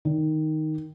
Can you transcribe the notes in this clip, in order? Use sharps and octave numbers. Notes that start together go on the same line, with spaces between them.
D#3